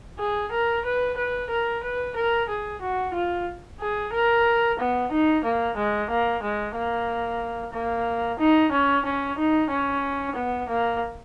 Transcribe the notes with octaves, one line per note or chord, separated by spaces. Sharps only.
G#4
A#4
B4
B4
A#4
B4
A#4
G#4
F#4
F4
G#4
A#4
B3
D#4
A#3
G#3
A#3
G#3
A#3
A#3
D#4
C#4
C#4
D#4
C#4
B3
A#3